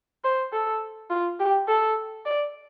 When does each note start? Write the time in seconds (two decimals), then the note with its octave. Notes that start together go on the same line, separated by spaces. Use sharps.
0.24 C5
0.53 A4
1.10 F4
1.40 G4
1.68 A4
2.26 D5